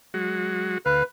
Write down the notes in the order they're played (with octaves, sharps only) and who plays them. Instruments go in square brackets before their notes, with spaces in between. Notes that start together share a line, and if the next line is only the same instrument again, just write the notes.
[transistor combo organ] F#3 G#3 F#4
[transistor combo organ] D2 F5 [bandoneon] B4